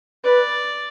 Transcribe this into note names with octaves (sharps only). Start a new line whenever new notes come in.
B4 D5